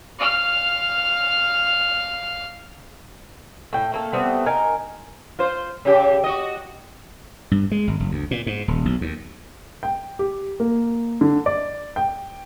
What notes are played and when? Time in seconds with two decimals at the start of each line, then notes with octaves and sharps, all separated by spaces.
0.19 F5 F6
3.73 A2 G5
3.92 A3 A#3 A4
4.13 G3 A3 B3 C4
4.46 D#4 A#4 G#5
5.39 F4 C5
5.85 C#3 G4
6.24 F#4 D#5
7.51 G2
7.71 G#3
7.87 G#1
8.00 F#1
8.11 D2
8.31 A#2
8.47 G#2
8.68 D#1
8.85 B1
9.01 D#2
9.83 G5
10.19 G4
10.60 A#3
11.21 D3
11.46 D5
11.96 G5